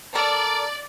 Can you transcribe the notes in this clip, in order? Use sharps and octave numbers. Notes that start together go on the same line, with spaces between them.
A4 A#4 D5 A#5